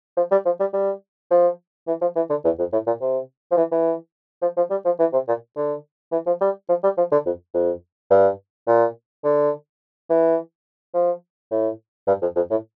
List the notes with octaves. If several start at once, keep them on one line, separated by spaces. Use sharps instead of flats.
F3
G3
F3
G3
G3
F3
E3
F3
E3
D3
E2
F2
A2
A#2
C3
F3
E3
E3
F3
F3
G3
F3
E3
C3
A#2
D3
E3
F3
G3
F3
G3
F3
D3
F2
F2
G2
A#2
D3
E3
F3
A2
G2
F2
F2
A2